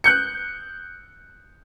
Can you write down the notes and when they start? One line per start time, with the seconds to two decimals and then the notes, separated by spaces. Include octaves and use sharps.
0.04 F#6 G6 C#7